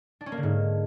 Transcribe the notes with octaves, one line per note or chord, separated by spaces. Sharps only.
D4
C#4
A#3
D3
G#2